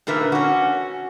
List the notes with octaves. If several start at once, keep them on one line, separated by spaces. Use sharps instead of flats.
A#2 D3 A#4 B4 E5
C#4 F#4